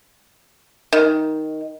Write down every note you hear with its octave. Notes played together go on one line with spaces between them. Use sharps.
D#3